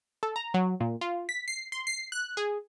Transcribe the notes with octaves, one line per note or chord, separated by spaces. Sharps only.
A4
A#5
F#3
A#2
F4
B6
C7
C6
C7
F#6
G#4